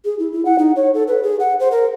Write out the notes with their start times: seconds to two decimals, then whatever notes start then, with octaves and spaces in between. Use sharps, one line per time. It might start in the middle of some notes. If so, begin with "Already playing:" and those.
0.05 G#4
0.19 E4
0.32 E4
0.45 F#5
0.59 D#4
0.76 C#5
0.94 A4
1.08 B4
1.23 G#4
1.40 F#5
1.60 C5
1.71 A#4